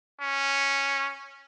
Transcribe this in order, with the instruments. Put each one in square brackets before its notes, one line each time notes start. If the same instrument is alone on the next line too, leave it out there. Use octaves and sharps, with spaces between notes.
[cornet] C#4